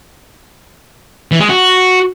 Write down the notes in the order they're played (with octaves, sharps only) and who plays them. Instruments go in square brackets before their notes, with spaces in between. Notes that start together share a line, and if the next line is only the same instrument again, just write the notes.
[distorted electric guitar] E3
G#3
F#4